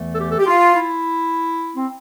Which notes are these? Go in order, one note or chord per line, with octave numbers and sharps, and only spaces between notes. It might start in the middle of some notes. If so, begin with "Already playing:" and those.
Already playing: E2 E3 A3
A4
G4
A4
G4
F4
E4
C4